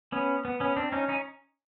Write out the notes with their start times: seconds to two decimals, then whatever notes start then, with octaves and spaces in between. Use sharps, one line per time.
0.12 B3 C#4
0.45 B3
0.60 B3 C#4
0.76 C4 D4
0.92 C#4 D#4
1.09 C#4 D#4